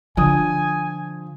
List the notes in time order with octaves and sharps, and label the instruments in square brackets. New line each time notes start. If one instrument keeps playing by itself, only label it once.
[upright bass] D3 [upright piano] F3 D#6 [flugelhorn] G#5